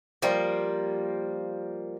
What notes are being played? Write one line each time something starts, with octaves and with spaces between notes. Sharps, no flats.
F3 G3 A#3